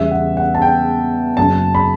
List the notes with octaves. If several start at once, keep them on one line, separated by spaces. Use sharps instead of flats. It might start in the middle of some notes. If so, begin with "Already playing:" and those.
Already playing: E2 C#3 E3 G3 B3 E5
F#5
F#5
A5
G5
F#1 F#2 C#3 F#3 A5
B5